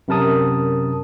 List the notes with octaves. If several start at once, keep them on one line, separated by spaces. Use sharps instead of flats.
F#2 C3 A#4 A5 D#6